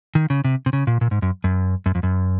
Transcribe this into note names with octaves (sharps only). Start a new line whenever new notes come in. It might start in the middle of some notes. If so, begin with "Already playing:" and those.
D#3
C#3
C3
C3
C#3
A#2
A#2
G#2
F#2
F#2
F#2
F2
F#2